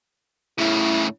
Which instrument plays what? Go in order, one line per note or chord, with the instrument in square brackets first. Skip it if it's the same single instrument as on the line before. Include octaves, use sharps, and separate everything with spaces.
[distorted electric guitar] A2 C#3 [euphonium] E4